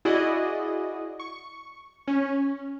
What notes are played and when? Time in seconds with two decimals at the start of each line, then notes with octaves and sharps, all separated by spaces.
0.05 E4 F#4 G#4 D5 D#5
1.20 C#6
2.07 C#4